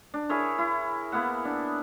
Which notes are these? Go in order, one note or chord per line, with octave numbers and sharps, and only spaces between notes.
D4
E4 G#4 A#4 C#5
E4
A#3 B3 E4 F#5
D4